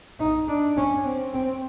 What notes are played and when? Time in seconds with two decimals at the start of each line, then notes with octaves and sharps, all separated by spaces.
0.20 D#4
0.48 D4
0.77 C#4
1.05 C4
1.34 C4